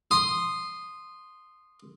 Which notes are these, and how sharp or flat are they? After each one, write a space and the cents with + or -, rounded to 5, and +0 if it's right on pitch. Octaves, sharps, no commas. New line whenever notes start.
C6 +0 D#6 -10